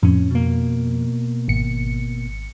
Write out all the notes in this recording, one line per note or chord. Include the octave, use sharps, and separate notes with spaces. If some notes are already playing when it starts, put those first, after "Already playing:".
F2 A2 C#4
B2 A#3
G#1 C#7